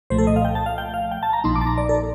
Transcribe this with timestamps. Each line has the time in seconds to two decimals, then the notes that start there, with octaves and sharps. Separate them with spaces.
0.10 C2 A#2 F3 A3 C5
0.18 A4
0.27 D#5
0.36 F5
0.45 G5
0.55 A5
0.66 F5
0.78 G5
0.94 F5
1.11 G5
1.23 A5
1.33 A#5
1.44 A#1 A#2 F3 A#3 D#4 C6
1.56 D6
1.61 A5
1.67 A#5
1.78 D5
1.89 A4